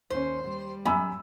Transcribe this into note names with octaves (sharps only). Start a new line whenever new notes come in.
D#2 C#4 C5
G3
F#2 G#5 B5 E6